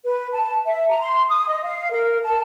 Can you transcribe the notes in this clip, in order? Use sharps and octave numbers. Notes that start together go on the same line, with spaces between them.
B4
A5
E5
A#5
C6
D#6
D#5
F5
A#4
A5